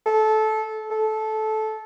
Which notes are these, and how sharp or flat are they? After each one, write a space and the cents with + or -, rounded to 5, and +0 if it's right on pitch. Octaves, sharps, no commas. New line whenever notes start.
A4 -20
A4 -15